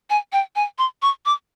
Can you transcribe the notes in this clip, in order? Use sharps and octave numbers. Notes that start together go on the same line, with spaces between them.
G#5
G5
G#5
C6
C#6
D6